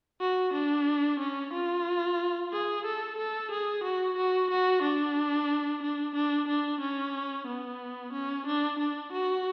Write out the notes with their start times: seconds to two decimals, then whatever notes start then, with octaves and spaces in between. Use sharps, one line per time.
0.21 F#4
0.54 D4
1.20 C#4
1.54 F4
2.52 G#4
2.86 A4
3.18 A4
3.52 G#4
3.84 F#4
4.17 F#4
4.51 F#4
4.83 D4
5.83 D4
6.16 D4
6.49 D4
6.81 C#4
7.47 B3
8.13 C#4
8.47 D4
8.79 D4
9.13 F#4